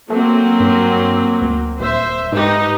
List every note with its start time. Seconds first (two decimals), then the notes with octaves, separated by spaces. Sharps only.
0.10 F#3 A3 A#3 C4
0.60 G2
1.41 D2
1.80 D#1 C5 E5
2.32 G#2 D#4 G4 B4